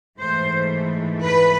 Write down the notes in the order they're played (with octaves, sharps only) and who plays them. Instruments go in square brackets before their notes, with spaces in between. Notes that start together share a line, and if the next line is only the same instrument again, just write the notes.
[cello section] G#2 E3 A3 C5
B4